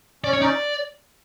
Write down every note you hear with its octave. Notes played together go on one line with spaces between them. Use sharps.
C#4 D5
C#5
C#4 D#4 D5